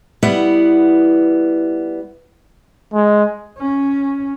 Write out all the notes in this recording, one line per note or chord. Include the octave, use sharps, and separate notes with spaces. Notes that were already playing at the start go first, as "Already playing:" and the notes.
G3 B3 E4 F#5
G#3
C#4